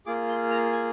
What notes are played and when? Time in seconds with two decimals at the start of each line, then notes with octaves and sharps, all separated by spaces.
0.06 A#3 F4 G#4 D6
0.28 C6
0.51 A#5
0.73 G#5